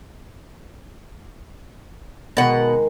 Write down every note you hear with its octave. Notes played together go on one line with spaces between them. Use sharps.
B2 D#3 G#3 F#5